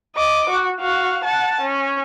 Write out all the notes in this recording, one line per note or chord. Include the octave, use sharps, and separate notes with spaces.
D#5 D6
F#4
F#4 F5
F#5 A5
C#4